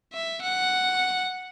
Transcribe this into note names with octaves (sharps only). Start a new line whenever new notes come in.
E5
F#5